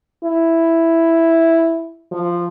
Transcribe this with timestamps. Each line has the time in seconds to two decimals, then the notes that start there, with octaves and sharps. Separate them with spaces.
0.24 E4
2.12 F3